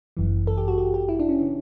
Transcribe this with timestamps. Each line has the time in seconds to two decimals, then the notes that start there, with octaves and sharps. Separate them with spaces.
0.17 G1 F#2 E3
0.47 A4
0.57 G4
0.68 F#4
0.78 G4
0.94 G4
1.09 E4
1.19 D4
1.29 C#4
1.39 C#3 E3